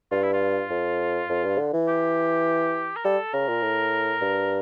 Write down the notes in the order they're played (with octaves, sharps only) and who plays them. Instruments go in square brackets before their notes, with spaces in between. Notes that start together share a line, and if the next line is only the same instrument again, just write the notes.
[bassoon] G2 [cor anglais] F4
[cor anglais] E4
F4
[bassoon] F2
F2
G2
D3
E3
[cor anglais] G4
A#4
[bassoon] G3 [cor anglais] A4
[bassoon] C#3 [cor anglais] A#4
[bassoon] A#2
A2
G2